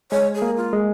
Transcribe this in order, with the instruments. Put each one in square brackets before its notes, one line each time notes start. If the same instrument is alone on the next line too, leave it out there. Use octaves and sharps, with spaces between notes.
[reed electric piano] G#3 [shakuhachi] C#5
[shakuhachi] G#4
[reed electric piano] A#3
[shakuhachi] F4
[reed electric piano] G#3